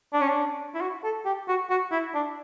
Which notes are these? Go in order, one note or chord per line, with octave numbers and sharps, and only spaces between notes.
D4
C#4
D4
E4
F#4
A4
G4
F#4
F#4
E4
D4